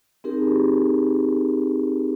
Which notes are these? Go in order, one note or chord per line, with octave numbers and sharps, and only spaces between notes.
C4 D#4 G4 G#4 A#4